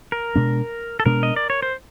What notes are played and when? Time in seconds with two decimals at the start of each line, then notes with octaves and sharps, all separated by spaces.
0.12 A#4
0.35 B2 G#3 B3 D4
1.00 A4
1.05 B2 G#3 B3 D4 A#4
1.23 D#5
1.36 D5
1.50 C#5
1.62 C5